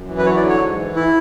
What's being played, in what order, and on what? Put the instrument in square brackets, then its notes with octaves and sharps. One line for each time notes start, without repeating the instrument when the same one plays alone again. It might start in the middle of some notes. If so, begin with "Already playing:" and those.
Already playing: [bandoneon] F#2
E3
B4
F#3 C#5
D5
D3
C#5
G#2
E3
E4